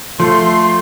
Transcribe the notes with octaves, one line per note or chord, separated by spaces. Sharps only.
F3 A3 C6